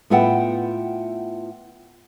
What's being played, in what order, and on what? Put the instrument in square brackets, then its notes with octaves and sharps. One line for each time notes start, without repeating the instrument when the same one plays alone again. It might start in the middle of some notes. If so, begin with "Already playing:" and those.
[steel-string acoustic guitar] A2 B3 F4 E5 F#5 G5